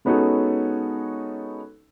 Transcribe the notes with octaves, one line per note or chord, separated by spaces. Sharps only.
G#3 B3 C#4 D#4 F#4 A4